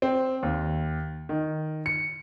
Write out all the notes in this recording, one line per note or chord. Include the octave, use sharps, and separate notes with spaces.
C4
D#2
D#3
C#7